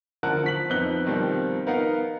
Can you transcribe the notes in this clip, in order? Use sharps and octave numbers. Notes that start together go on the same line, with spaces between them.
D3 F3 A#4 F#5 A5 F#6
F3 B6 F#7
F2 B3 C4 D#4 F#6 G7
B2 D#3 F3 G3 C4
B3 D#4 A#4 F5 F#5